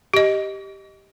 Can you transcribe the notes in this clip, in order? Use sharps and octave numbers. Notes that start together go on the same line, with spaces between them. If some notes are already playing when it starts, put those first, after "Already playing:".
G4 D#5